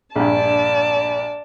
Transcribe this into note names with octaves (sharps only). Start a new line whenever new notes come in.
A#1 G2 D5 A5